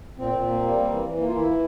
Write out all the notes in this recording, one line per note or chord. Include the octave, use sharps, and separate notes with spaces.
A#2 C4
A#2
A#3
G3
A#3
E3
E3
A#3
F4
E3 E4
E3